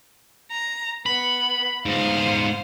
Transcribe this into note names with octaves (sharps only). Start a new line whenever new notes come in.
A#5
B3 B5
G#2 B3 C5 F5